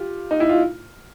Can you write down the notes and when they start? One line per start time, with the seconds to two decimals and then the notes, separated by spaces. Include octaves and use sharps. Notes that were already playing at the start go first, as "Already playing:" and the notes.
Already playing: F4 G4
0.31 D#4
0.40 E4
0.49 F4